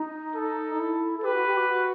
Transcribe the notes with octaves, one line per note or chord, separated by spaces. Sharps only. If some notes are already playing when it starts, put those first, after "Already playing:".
Already playing: D#4
A4
D#4
E4
A4
G4 B4
F#4
G4
F#4
F#4